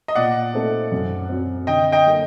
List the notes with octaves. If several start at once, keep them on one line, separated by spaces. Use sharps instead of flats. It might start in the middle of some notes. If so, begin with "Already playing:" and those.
D#5
A#2 D5 F#5
A3 D#4 A4 C5
F#2
F#3 C4
D3 D#5 G5
D#5 G5
F#3 A#3 F#4 A4